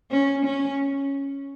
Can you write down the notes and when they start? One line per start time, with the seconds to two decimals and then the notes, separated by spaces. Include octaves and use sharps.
0.11 C#4
0.45 C#4